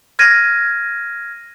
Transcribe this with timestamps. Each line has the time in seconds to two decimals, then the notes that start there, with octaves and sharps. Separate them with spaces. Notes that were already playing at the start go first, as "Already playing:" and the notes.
0.19 F6 G#6 A#6 D#7